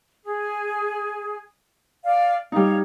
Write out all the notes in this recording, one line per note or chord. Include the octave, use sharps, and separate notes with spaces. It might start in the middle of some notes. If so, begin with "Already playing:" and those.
G#4
D5 F5
G3 D#4 C#5 F5